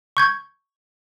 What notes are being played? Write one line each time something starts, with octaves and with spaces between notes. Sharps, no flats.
C#6 G6 G#6